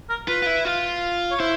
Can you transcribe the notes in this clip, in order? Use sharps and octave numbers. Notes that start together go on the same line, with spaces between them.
A#4
F4 B4
F4
E4
F4
C#5
E4 C5